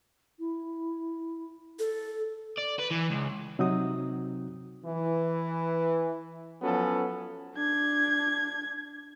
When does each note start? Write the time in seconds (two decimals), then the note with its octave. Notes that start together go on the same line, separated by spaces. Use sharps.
0.39 E4
1.79 A4
2.58 D5
2.80 B4
2.91 E3
3.11 C#2
3.59 C3 F#3 C4 D#4 F#4 D#6
4.85 E3
6.62 F3 F#3 B3 C#4 A4
7.55 D4 G#6